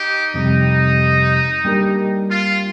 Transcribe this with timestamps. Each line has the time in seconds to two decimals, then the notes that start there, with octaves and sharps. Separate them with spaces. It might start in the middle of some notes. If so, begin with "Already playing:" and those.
Already playing: D#4 G4
0.34 F2 C3 G3 D#4
1.65 G3 A#3 D4 G4 A#4
2.30 F4